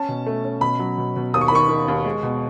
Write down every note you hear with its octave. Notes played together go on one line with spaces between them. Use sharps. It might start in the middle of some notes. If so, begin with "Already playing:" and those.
Already playing: C#4 A5
B2
A3
C#4
B2 B5
F#3
B2
B2
D#2 D#6
C#6
B5
D#3 C#6
D#3
D#2
G#3
B2